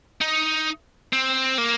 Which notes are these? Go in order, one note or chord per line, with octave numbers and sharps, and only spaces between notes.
D#4
C4
A#3